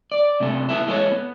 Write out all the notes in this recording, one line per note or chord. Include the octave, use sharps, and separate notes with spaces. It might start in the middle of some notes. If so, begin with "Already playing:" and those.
D5
C3 A3 D4 A4
B3 E4 A4
E3 G#3 A#3 A4 C#5
B3